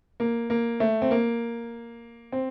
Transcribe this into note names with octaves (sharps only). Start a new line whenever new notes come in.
A#3
A#3
A3
C4
A#3
C4